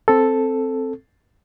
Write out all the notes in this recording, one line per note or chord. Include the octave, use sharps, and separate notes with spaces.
C4 A4